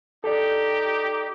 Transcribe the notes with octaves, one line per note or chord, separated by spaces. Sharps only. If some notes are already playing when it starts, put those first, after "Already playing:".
D#4 G4 A4 D5